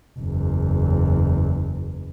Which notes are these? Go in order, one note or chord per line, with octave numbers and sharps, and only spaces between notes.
F#1 E2